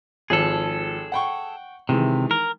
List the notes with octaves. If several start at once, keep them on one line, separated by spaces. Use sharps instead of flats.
G#1 F3 G#4 A4
F#5 G5 C#6
C3 D#3 E3 G#3
A#4